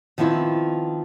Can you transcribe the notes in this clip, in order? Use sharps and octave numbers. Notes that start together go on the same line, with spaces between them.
D#3 F3 B3 C4 E4